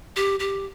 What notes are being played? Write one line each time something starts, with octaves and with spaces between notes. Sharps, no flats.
G4
G4